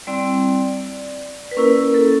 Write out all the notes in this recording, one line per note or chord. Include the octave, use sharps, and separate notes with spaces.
G3 C4 E4 D5
B4
A#3 C#4 E4 A#4
A#4
A4